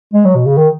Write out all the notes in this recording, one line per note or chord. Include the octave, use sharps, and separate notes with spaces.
G#3
F#3
B2
C#3
D#3